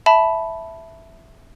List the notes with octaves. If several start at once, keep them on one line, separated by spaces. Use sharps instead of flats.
E5 A5 B5